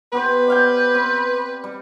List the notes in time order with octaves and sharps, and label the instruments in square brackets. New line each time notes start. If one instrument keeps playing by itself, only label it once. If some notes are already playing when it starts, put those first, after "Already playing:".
[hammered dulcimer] B3 G4 C5 [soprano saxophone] B4
[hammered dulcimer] D5 F5 G5
C4
G3